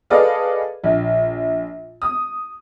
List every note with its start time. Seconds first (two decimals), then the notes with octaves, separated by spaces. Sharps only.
0.10 G#4 A4 B4 D5 D#5 F5
0.84 A#1
2.02 D#6